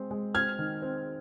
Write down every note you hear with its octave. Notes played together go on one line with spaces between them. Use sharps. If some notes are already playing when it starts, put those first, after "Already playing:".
Already playing: G#3 C4
G#3
C4 F6 G#6
D#3
C4